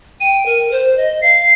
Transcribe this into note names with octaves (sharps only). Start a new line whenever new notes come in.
G5 D#7
A#4
C5
D#5
F5 C7